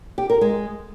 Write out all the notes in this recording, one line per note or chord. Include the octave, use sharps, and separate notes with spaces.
G4
A#4
G#3